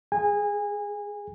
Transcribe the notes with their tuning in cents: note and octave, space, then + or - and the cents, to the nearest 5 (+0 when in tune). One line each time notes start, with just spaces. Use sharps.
G#4 +0 G#5 -25